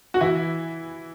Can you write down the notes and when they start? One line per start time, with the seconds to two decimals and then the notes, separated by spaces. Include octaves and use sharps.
0.14 F#4
0.21 E3 E4